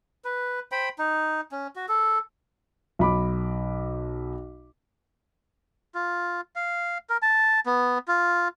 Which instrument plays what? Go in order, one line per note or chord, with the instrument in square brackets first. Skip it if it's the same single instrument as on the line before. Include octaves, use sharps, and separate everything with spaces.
[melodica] B4
C5 G5 B5
D#4
C#4
F#4
A4
[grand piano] B1 B5 D6
[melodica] F4
F5
A#4
A5
B3
F4